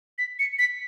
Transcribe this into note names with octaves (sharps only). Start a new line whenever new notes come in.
B6
C#7
B6